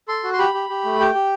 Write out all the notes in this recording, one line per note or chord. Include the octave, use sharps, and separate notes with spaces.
A4 C6
F#4
C6
G4 B5
G4
G4
A3
G4 G5
G4